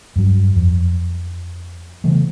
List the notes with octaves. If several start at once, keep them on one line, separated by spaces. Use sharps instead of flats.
G2 F#3
F2
C#3 E3 G3 A3